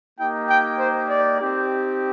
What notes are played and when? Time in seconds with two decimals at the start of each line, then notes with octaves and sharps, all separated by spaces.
0.18 A#3 D#4 G4 G5
0.49 G5
0.79 C5
1.10 D5
1.40 C4 D#4 G4